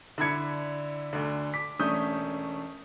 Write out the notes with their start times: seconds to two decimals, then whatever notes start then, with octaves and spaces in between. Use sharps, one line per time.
0.18 D3 D4 E4 B5 G#6 C#7
1.13 D2 D3
1.54 D6 B6
1.79 E1 A3 C#4 D4 D#6 G6